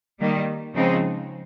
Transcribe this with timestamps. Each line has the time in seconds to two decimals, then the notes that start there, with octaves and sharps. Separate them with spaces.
0.20 D#3 G3 A#3
0.74 C#3 F3 G#3 C4 D#4